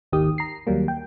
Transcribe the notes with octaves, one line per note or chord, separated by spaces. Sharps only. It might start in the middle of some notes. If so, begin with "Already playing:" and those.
G#1 D#2 D#3 G4 D#6
A#5 C7
D#2 F#3 G3 A#3
G5